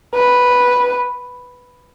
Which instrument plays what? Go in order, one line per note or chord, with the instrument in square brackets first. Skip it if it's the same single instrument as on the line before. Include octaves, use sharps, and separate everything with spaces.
[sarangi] B4